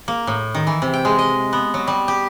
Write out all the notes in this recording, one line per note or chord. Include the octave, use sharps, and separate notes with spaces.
A#3
A2
D#3
E3
C3
G5
G#3
D#5
B3
F#3
G3
G4